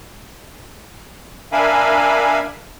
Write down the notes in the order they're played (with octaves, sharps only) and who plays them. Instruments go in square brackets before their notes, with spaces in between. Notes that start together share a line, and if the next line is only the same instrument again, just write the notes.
[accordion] D4 A#4 E5 F5 G#5 B5